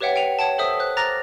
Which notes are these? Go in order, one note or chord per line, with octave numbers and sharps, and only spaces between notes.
G4 B4 C#5 E5 F#5 G5
G5 C#7 D#7 F7
C#5 F#5 G5 A5
A4 C5 E5 D#6 E6
C5 F#6
A#5 D6 F6 F#6 A6 A#6